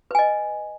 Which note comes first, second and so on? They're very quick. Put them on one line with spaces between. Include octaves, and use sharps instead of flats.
B4 G#5 D#5